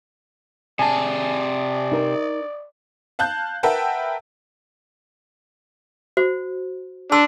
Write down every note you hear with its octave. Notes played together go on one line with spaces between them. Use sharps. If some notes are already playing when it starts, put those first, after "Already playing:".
C3 G#4 D5 G#5 A5
D#4 A#4
F5 A5 F#6 G6
A#4 B4 E5 F#5 G5 A5
F#4 C5
D4 A5 C6 E6